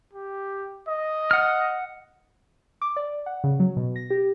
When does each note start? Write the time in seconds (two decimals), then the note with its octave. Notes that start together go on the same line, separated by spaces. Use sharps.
0.13 G4
0.88 D#5
1.31 F#5 F6
2.82 D6
2.96 D5
3.26 F#5
3.44 C#3
3.60 F#3
3.77 B2
3.96 A#6
4.10 G4